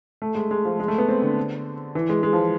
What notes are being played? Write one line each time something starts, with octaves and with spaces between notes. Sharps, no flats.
A3
G#3
G#3
F3
G#3
A3
B3
C4
D3
E3
G#3
G#3
F3